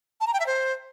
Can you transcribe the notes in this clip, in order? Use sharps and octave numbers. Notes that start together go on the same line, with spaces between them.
A5
A#5
G5
E5
C5